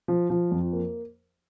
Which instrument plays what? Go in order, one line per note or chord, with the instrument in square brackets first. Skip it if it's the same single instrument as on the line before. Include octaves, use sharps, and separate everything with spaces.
[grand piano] F3
F3
F2
A#3